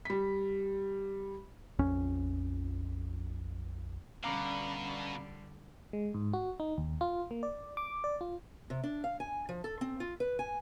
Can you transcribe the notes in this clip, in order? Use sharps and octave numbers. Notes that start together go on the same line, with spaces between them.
G3 B6
A#1 F2 C#4
B2 D3 G3 C#4 F5 A#5 B5 D6
G#3
G#2
F#4
D#4
D#2
F4
A#3
D5
D6
D5
F4
C3
D4
F5
G#5
F3
A4
C4
F4
B4
G#5